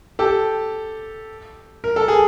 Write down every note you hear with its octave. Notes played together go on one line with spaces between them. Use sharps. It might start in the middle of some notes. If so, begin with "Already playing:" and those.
G4 A4
A#4
A4
G#4